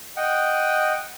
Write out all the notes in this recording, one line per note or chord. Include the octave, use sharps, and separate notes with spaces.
D#5 F#5 G5